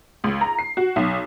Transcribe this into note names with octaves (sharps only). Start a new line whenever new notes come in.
C#2
A#5
C7
F#4
B1